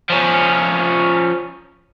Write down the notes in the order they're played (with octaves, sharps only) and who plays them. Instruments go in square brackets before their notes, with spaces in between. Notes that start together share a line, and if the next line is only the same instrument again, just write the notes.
[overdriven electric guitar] F3 C#4